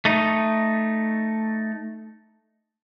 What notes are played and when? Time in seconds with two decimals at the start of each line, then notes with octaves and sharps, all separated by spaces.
0.05 A3 D#4